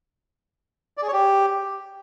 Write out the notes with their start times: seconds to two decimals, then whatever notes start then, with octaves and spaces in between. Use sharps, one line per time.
0.97 D5
1.03 G#4
1.08 C#5
1.13 G4